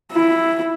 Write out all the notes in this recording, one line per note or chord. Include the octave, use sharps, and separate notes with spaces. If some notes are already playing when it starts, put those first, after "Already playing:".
E4